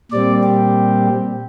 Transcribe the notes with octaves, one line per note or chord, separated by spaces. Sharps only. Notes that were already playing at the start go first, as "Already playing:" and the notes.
A#2 G3 C4 D5
G4